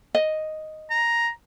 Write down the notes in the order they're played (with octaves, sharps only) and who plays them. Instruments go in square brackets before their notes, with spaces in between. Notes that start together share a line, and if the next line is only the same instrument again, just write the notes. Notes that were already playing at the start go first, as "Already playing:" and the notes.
[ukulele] D#5
[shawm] A#5